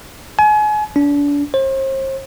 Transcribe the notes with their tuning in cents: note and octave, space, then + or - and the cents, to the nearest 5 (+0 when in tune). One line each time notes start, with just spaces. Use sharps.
G#5 +35
D4 -35
C5 +40